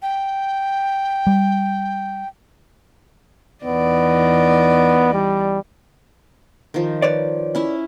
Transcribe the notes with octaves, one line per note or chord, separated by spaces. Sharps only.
G5
G3
E2 B3 D#4 D5
G3
D#3 F3
B4 C#5 D5
C#4 E4 E5